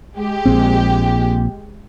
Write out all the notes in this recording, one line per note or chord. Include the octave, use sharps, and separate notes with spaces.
G#3 G4
A#1 A#2 C4